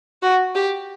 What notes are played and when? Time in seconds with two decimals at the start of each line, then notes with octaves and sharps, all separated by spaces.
0.22 F#4
0.55 G4